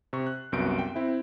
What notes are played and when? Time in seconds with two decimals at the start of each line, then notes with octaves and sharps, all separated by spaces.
0.13 C3 C#6
0.27 F#6
0.52 C2 F#2 B3 F#4 G6 D7
0.79 G5
0.95 C4 E4 E5